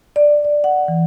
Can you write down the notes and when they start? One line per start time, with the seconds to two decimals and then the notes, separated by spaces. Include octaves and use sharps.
0.16 D5
0.45 D5
0.64 F#5
0.88 E3